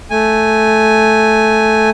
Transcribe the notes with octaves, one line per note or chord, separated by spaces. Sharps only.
A3 G#5